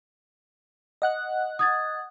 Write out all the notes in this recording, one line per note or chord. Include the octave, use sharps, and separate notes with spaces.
D#5 F#5 F#6
D#6 G#6 A6